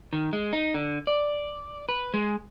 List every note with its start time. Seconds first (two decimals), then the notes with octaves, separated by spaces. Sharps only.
0.13 D#3
0.33 G#3
0.53 D#4
0.74 D3
1.07 D5
1.89 B4
2.14 G#3